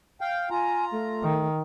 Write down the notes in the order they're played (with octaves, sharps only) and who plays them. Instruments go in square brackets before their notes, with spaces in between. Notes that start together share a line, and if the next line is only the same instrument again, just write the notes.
[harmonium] F5 G5
[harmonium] F4 A#5 [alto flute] G#5
[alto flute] A3
[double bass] D#3